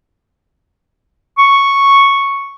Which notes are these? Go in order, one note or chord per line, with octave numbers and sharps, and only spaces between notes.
C#6